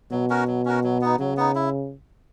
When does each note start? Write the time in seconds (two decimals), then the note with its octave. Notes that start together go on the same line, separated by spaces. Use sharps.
0.11 B2 F#3
0.30 C#4 F#4 A#4
0.47 F#3
0.65 C#4 F#4 A#4
0.83 F#3
1.01 B3 D#4
1.19 C#3 F#3
1.37 B3 D#4
1.55 E4